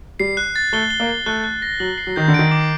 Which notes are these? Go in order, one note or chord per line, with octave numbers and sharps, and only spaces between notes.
G3 C7
F#6
A6
A3 G7
G7
A#3
G7
A3 F#6
F#6
A#6
F#3 F#7
C7
F#3
D#3 G6
D3
D#3 D7
D6